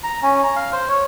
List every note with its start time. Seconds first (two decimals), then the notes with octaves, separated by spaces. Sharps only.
0.04 A#5
0.23 C#4
0.43 A#5
0.56 F5
0.72 C5
0.88 C#5